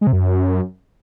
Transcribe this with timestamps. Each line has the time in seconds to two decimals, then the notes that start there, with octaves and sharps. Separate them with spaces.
0.01 G#3
0.07 C3
0.13 F#2